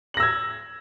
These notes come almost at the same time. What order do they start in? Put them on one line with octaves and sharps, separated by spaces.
F#7 A#6 E6 G#6